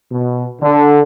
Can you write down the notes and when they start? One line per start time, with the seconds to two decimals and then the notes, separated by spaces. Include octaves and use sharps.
0.12 B2
0.62 D3